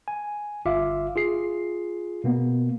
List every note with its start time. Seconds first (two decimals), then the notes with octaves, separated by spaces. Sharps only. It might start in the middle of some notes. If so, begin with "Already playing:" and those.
0.08 G#5
0.65 G1 F4 E5 F5 D6
1.16 F4 G#4 C7
2.24 B2 A#3 B3